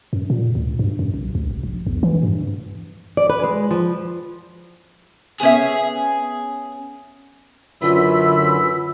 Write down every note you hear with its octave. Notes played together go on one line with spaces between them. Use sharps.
F#2
A#2
D2
G2
F#2
B1
D2
E1
A#1
E2
E3
G2
D5
B4
G#3
F3
B3 C#4 G#4 E5
F#2 D3 E3 F4 B5 E6